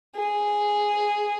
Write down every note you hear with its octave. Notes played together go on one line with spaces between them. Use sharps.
G#4